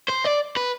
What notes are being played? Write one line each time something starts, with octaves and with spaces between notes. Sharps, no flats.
C5
D5
B4